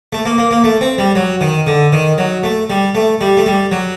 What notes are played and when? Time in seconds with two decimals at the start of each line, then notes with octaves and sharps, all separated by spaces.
0.13 A3
0.25 A#3
0.38 A#3
0.51 A#3
0.64 A3
0.81 C4
0.98 G3
1.15 F#3
1.41 D#3
1.67 D3
1.92 D#3
2.18 F#3
2.43 A3
2.70 G3
2.95 A3
3.21 G3
3.37 A3
3.46 G3
3.72 F#3